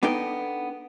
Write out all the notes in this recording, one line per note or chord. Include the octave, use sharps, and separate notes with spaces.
B3 D4 D#4 A4 G5